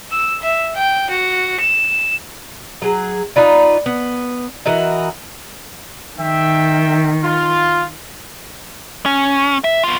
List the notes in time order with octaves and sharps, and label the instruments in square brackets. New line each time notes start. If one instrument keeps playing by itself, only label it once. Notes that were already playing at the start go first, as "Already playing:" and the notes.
[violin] E6
E5
G5
F#4
E7
[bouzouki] F#3 G#4
D#4 F4 B4 D5
B3
E3 F#4 A#4 D#5
[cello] D#3 [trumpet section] E5 G5
[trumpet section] F4
[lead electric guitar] C#4
E5
B3 F4